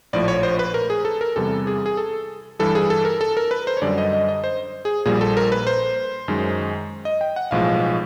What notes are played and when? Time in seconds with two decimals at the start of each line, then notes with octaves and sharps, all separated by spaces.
0.13 A#1 A2 F3 D5
0.28 C#5
0.43 C5
0.59 B4
0.74 A#4
0.90 G#4
1.05 A4
1.21 A#4
1.36 E2 C3 E3 G3 A4
1.67 G#4
1.86 G#4
1.97 A4
2.59 G2 E3 G3 A4
2.75 G#4
2.90 A4
3.05 A#4
3.21 A4
3.37 A#4
3.51 B4
3.67 C5
3.77 C#5
3.82 F#2 D3 G3 D5
3.98 D#5
4.13 D#5
4.29 D#5
4.44 C5
4.85 G#4
5.05 A#1 A#2 G3 G#4
5.21 A4
5.37 A#4
5.52 B4
5.67 C5
6.28 F#2 D#3 G#3
7.05 D#5
7.21 G5
7.36 F#5
7.51 B1 A2 F3 G#3 F5